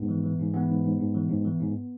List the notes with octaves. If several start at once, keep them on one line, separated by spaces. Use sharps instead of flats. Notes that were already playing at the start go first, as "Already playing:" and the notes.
Already playing: G#2 B3
E3
E3
G#2
E3 B3
G#2
G#2
G#2
E3
G#2
E3
G#2